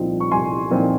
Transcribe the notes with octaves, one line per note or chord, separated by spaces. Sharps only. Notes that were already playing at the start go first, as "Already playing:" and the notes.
Already playing: C2 A#2 F3 C4 D#4
C#6
C2 G#5 C6
A#2 F3 C4 D#4